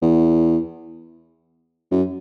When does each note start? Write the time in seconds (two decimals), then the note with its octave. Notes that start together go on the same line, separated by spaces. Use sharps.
0.02 E2
1.91 F#2